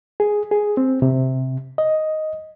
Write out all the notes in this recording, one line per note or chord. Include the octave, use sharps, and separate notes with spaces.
G#4
G#4
C4
C3
D#5